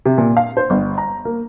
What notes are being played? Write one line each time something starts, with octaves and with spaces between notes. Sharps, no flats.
C3
A#2
F5
C5
G1
A#5
A#3